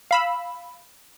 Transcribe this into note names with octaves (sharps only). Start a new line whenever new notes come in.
F5 B5 E6